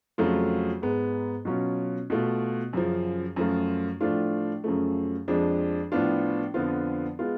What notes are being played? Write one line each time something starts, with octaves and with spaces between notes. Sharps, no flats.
F2 C#3 F#3 A3 F4
G#2 G#3 B3
B2 F#3 C#4 F4
B2 A3 F4
F#2 C#3 F3
F#2 F3 A3 F4
A2 F3 A3 D4 F4
F#2 C#3 F3 A3
F2 F3 G#3 D4
A2 F3 B3 D4 F4
F2 D3 F3 B3 F4
G#3 B3 F4